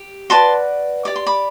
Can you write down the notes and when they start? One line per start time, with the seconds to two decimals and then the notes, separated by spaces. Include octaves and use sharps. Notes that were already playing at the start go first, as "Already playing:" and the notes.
Already playing: G4
0.30 F#4 B4 D5 A5 C6
1.05 G4 D5 D6
1.16 C6
1.26 B5 D6